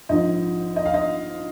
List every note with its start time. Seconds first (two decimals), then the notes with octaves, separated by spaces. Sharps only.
0.09 A#1 G#2 F3 D#5
0.76 D#5
0.85 F5
0.94 D#5